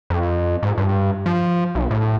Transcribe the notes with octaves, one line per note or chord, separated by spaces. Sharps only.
F2
G#2
G2
F3
B1
A2